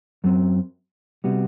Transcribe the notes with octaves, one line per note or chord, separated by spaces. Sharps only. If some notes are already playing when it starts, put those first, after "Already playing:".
F#2 F#3 C4
C3 G3 B3 F#4